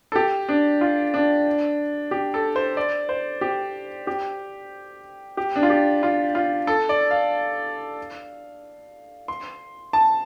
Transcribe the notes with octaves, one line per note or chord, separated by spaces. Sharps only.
A4
G4
D4
F4
D4
G4
A4
C5
D5
C5
G4
G4
G4
D4
F4
G4
F4
F4
A4
D5
F5
C6
A5